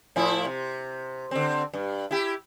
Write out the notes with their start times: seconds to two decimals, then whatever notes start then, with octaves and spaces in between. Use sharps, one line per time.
0.16 A2 F3 E4
0.45 C3
1.31 D3 C4
1.73 G2
2.11 E4 G4